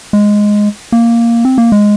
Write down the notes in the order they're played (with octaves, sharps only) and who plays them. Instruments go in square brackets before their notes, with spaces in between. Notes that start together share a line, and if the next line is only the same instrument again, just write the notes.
[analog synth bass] G#3
A#3
C4
A#3
G#3